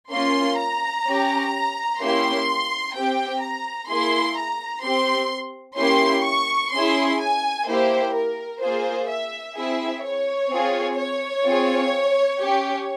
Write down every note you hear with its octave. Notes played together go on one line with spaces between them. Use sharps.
A#3 C#4 F4 C6
A#5
C#4 G4
A#3 C#4 E4 G4 C6
C4 G4 G5
A#5
A#3 E4 G#4 C6
A#5
C4 G4 C6
A#3 C#4 E4 G4 C6
C#6
C#4 E4 G#4 C6
G#5
A#3 E4 G4 C5
A#4
A#3 F4 G#4 C5
E5
C4 E4 G#4 E5
C#5
C4 F4 G#4
C#5
C4 F4 G#4
C#4 G4